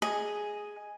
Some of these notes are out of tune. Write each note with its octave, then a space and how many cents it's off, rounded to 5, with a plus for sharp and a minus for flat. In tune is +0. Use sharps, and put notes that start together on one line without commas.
G#4 +0 D#5 +0